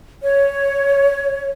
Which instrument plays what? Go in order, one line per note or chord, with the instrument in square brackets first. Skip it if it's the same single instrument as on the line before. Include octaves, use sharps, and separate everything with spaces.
[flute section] C#5